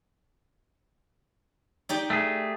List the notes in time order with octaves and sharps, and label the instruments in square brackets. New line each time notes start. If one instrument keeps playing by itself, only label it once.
[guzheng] D#4 G4 D5
[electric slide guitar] A3 G#4